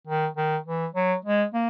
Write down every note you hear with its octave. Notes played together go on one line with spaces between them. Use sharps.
D#3
D#3
E3
F#3
G#3
A#3